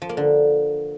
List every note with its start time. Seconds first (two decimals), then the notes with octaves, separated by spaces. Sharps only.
0.02 F3
0.09 A#3
0.17 D3